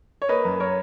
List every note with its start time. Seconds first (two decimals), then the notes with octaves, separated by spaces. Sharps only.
0.22 C#5
0.29 A#3 B4 D#5
0.45 F#2
0.60 A#4 C#5